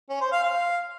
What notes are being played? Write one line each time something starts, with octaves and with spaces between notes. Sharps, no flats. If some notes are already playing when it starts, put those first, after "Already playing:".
C#4
C5
F5
F5